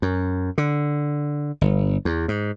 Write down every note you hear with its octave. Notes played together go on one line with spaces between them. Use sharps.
F#2
D3
G1
E2
G#2